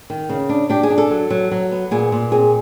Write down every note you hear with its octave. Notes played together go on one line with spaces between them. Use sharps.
D#3
C#3
D4
D4 G4
G#4
D4
A4
F#3
F#3
F#3
B3
A#2 G#4
A#2
C4 G#4